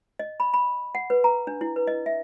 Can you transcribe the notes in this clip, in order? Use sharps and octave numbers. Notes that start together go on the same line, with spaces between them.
D#5
B5
B5
F#5
B4
A#5
D4
E4
B4
D#5
E5